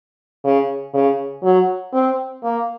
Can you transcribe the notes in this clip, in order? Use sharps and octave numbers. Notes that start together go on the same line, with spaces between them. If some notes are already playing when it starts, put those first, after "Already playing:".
C#3
C#3
F#3
C4
A#3